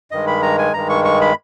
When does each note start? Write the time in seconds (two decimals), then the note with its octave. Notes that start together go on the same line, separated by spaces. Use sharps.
0.11 G2 D#3 G#3 D#5
0.27 B5
0.42 A#5
0.59 G#5
0.74 G2 D#3 G#3 A#5
0.89 C#6
1.05 C#6
1.21 B5